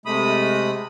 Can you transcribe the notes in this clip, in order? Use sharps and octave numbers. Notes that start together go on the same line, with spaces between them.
C3 G#3 A3 B5 D#6